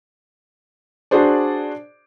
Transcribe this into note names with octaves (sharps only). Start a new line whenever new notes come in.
D4 F#4 G#4 C5 D5